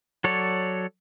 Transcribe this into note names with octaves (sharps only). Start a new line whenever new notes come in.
F#3 A4 C#5 D5